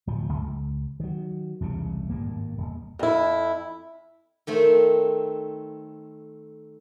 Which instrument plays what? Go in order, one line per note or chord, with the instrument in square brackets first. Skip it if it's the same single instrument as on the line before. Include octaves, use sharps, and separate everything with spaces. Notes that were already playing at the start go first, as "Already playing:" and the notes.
[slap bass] D1 F3
C#2
D#3 F#3
E1 C2 C#3
G#1 G2 A#3
D#1
[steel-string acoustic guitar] F2 E4
[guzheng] D#3 A3 C4